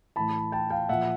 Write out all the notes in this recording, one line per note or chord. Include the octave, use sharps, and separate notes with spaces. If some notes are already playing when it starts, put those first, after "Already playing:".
A2 E3 A5 B5
G5 A5
F5 G5
A#2 F3 E5 F#5